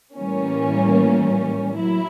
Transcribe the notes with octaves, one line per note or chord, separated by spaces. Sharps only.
A2 E3 G3 A#3 C#4
F#3 E4